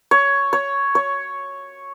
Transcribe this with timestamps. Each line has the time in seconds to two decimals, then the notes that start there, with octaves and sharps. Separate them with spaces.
0.11 C#5
0.53 C#5
0.95 C#5